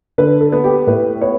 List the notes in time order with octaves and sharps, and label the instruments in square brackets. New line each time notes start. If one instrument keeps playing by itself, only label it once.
[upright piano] D3 B4
A4
B3
G4
A2 B4
B3 C#5